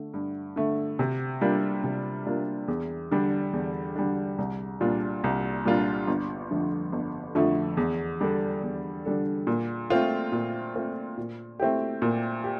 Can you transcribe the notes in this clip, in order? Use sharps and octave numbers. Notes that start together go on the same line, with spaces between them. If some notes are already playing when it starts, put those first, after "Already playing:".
Already playing: D3 A3
G2
D3 A3
C3
G3 A#3 D4 F4
C3
G3 A#3 D4 F4
E2
D3 G3 D4
E2
D3 G3 D4
C2
A#2 G3 D4 F4
C2
A#2 G3 D4 F4
G1
F2 D3 F3 A3
G1
F2 D3 F3 A3
E2
D3 G3 D4 A4
E2
D3 G3 D4 A4
A#2
A3 C4 F4
A#2
A3 C4 F4
A#2
A3 C4 E4 G4
A#2
G4